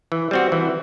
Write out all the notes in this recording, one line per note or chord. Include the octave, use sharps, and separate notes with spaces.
E3
G3 C4 F#4
E3